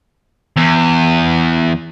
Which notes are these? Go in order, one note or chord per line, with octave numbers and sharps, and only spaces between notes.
E2